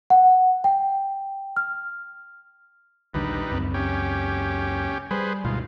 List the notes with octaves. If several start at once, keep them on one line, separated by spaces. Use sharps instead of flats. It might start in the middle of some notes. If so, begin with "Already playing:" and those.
F#5
G5
F6
A#1 D#2 D3 G3 D#4 B4
C#2 F#2 C4
C#4 G4
G3 G#4 B4 C5
D2 G#2 B2 F4